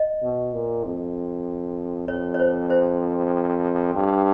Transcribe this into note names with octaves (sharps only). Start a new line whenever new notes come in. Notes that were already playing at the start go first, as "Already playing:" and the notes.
Already playing: D#5
B2
A#2
F2
F2 C#5
C#5
C5
C5
G2